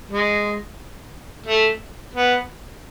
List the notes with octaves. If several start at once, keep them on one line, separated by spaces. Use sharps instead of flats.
G#3
A3
B3